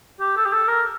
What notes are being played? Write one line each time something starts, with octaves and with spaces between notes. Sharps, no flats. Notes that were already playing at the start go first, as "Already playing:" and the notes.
G4
A4
G4
A4
A#4